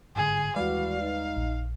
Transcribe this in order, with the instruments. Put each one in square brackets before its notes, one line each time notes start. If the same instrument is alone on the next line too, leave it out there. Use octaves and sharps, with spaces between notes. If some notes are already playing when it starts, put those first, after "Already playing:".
[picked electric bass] G1 G#2 D3 [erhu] G#4
[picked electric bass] D#2 G3 G#3 [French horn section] E3 F#4 [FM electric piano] B4 D5 [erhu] F5
[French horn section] D#4
[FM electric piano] A#1